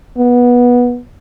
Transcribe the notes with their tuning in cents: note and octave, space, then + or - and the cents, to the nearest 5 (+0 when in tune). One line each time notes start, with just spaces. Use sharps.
B3 -15